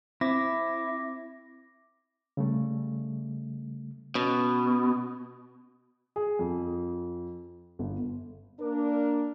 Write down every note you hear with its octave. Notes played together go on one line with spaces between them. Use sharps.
C4 E4 D6 A#6
C#3 G3 A3
B2 C#4
G#4
F2
G1
A#3 D4 A#4